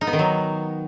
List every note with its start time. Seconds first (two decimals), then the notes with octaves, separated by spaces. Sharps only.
0.01 D#4
0.07 B3
0.13 D#3
0.19 F#3